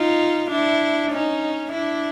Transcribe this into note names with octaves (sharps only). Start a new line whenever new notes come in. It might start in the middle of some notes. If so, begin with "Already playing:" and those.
Already playing: D#4 F4
D4 E4
C#4 D#4
D4 E4